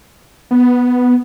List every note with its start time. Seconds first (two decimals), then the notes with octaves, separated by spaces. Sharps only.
0.51 B3